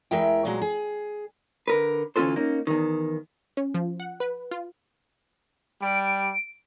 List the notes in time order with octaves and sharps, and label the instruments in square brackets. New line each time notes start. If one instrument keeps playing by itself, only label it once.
[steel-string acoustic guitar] E2 E3 G#3 A#4 E5 G5
A#2 F#3 G#3
G#4
[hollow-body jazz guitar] D3 A#4 B4
D2 E3 C#4 F4 A4 C5
A#3 C#4 D#4
E2 D#3
[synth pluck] C#4
F3
F#5
B4
F4
[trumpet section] G3 [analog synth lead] D7